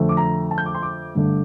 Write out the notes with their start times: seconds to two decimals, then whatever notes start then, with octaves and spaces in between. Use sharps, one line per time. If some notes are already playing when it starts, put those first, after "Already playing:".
Already playing: F2 D3 A3
0.09 D6
0.17 A#5
0.51 A5
0.58 G6
0.66 D6
0.75 C6
0.83 D6
1.15 G2 D3 A3